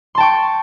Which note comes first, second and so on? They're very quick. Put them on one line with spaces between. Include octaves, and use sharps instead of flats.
C6 A5 G5 C#6